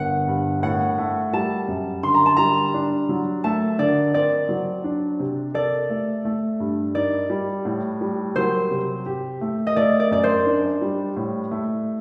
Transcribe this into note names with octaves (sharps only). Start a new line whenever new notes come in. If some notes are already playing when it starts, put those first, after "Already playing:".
Already playing: G1 F#5
G2
A2 F#5
A3
G3 A5
F#2
D3 C6
A#5
A5
G3 A#5
D4
F#3
A3 A5
D3 D5
C4 D5
F#3
D4
C3
A4 D5
A3
A3
G2
D#4 D5
G3
A2
G3
F#3 C5
C3
G4
A3
D#5
A3 D5
D5
F#2 D5
C5
D4
G3
A2
A3